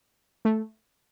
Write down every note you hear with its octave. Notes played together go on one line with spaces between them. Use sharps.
A3